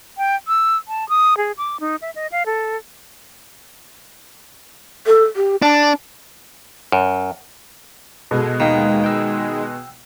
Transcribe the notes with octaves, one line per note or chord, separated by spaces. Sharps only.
G5
E6
A5
D#6
G#4
D6
D#4
E5
D#5
F5
A4
A4
G4
D4 A5
F#2
B2 G#3 B3 A4
D#2 D#3 F5 G5
G5 E6